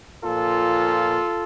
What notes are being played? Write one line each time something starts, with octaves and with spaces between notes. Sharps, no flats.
A#2 F3 F4 A4